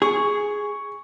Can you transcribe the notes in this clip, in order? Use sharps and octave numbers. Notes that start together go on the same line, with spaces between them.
G#4 C#6